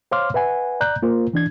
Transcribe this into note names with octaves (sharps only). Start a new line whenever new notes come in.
C5 C#5 F5 C6 D6 F6
B4 E5 F#5 G#5
D5 A#5 F#6 G6
A#3 F4 A#4 C5
E3 D4 G#6